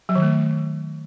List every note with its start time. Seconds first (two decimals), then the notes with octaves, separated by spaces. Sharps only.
0.09 F#3
0.15 D#3
0.22 A3